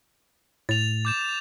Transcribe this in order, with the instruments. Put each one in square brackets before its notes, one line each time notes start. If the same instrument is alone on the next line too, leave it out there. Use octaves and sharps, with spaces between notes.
[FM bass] A2 [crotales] A6 F7
[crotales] D6 G6 E7